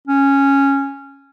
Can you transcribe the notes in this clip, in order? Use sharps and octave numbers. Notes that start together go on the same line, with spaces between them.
C#4